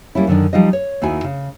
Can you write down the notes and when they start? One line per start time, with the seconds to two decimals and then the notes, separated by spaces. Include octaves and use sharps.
0.15 G3 A#3 C#4 E4
0.27 F#2 D3 D#3 D4
0.53 F3 G3 D#4 F4 D#5
0.73 C#5
1.02 D#2 D#4 E4 F#4 G#5
1.24 C#3